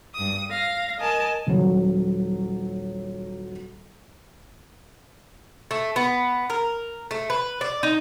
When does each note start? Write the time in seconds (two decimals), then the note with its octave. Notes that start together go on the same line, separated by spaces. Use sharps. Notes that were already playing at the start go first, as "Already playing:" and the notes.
0.14 G2 D#6
0.50 F5 A#6
0.99 A#4 D#5 G#5 A5
1.47 D#1 F#3
5.71 A3
5.96 B3
6.50 A#4
7.11 A3
7.30 B4
7.61 D5
7.83 D#4